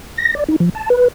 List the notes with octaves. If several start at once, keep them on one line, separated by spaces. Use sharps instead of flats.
A#6
D5
D#4
F3
A5
B4